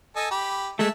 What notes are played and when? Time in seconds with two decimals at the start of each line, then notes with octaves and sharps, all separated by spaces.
0.16 A4 D#5 G#5
0.31 G4 B5
0.79 G#3 A3 E5 A5